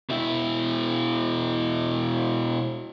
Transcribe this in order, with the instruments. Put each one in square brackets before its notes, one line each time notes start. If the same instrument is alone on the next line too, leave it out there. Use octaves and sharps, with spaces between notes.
[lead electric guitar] B2 E4